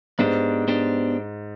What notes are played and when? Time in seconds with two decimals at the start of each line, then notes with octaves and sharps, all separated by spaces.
0.19 G#2 B3 D4 G4 C5
0.68 B3 D4 G4 C5